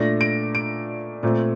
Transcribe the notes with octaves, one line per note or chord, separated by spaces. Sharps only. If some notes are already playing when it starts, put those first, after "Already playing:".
Already playing: A#2 A3 D4 A#6
D7
D7
A#2 A3 C4